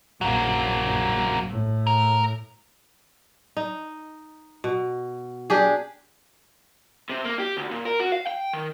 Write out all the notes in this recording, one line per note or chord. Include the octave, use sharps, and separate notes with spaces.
A#1 F#3 A#3
A2
A#4
D#4
B2
D4 G4 G#4
C3
A#3
G4
D2
A#2
A#4
F#4
F5
G5
D#3